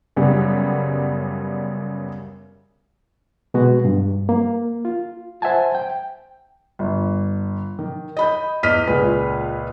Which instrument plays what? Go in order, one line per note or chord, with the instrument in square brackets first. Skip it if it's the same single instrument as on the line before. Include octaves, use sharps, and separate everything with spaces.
[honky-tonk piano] F#2 C#3 G3 B3
[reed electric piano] B2 G#3 B3 F#4
G2
A#3
F4
C5 E5 F#5 G#5 A5
G5
[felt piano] G1
D#3
D#5 B5 G6
E2 D#5 F6 B6 D#7
C#2 A#2 G#4 B4